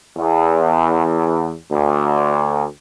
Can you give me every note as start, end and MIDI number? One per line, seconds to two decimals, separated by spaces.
0.17 1.53 40
1.71 2.64 38